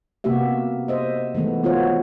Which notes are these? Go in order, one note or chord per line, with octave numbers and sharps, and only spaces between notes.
C3 A#3 B3 F#4 G4 E5
C5 D#5 E5
D#3 E3 G#3 A3 B3
B3 F4 F#4 C5 C#5